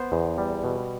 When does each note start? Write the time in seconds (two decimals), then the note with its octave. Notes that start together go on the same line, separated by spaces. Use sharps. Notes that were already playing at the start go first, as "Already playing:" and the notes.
Already playing: B3 C5
0.12 E2
0.38 G3
0.64 B2